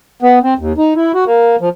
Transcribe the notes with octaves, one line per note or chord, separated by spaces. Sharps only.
B3
C4
D#2
D#4
E4
F#4
A#3
F3